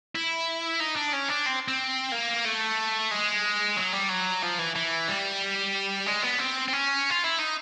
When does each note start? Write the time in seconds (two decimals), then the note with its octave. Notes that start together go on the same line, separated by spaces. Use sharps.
0.15 E4
0.80 D#4
0.96 D4
1.13 C#4
1.30 D4
1.46 C4
1.68 C4
2.12 A#3
2.45 A3
3.11 G#3
3.77 F#3
3.93 G3
4.09 F#3
4.43 F3
4.59 E3
4.75 E3
5.08 G3
6.07 G#3
6.23 B3
6.39 C4
6.68 C4
6.73 C#4
7.10 F4
7.24 E4
7.38 D#4